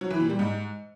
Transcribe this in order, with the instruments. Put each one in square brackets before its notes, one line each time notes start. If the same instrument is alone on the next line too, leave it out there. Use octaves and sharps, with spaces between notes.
[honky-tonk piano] F#3
E3
A#2
G3
G#2